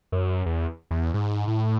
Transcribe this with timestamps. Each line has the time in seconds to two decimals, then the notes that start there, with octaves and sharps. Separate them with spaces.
0.12 F#2
0.46 E2
0.91 E2
1.14 G#2
1.47 A2